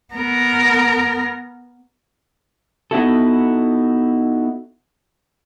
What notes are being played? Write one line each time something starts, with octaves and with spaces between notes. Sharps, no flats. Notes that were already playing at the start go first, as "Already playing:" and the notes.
B3 A#4
B3 D#4 E4 F#4 A4